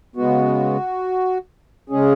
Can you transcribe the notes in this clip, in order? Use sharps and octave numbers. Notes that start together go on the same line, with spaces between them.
C#3 G#3 B3 F#4
C#3 G#3 C#4 G#4